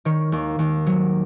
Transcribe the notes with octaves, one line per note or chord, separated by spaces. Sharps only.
D#3 C#5
D#2
D#2
F#3